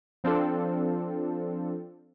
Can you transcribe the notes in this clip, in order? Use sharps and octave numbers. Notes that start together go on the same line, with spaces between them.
F3 C4 D4 F4 A4